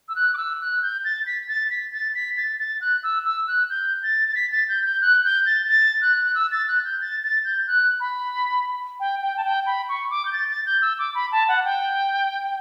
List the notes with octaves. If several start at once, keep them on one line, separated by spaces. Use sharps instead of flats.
E6
F#6
D6
E6
F#6
G6
A6
B6
A6
B6
A6
B6
A6
A6
F#6
E6
E6
F#6
G6
A6
A6
B6
A6
G6
G6
F#6
G6
A6
A6
F#6
F#6
E6
A6
F#6
G6
A6
A6
G6
F#6
B5
G5
G5
A5
G5
B5
C#6
D6
G6
A6
A6
G6
E6
D6
B5
A5
F#5
G5